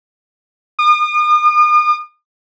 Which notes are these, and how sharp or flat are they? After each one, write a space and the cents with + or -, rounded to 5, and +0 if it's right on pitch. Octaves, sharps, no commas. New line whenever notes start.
D#6 -40